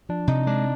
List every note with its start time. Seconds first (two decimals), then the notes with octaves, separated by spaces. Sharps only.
0.09 F3 D4
0.27 C3 D#4
0.47 G#3 D4